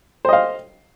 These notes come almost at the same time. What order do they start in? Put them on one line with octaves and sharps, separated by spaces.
C5 D#5 F5